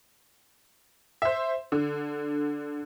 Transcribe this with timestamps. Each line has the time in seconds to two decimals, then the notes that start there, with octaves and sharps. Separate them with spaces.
1.22 C5 E5
1.72 D3